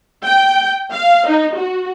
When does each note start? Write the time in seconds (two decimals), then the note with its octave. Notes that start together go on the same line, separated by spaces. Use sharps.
0.24 G5
0.92 F5
1.27 D#4
1.55 F#4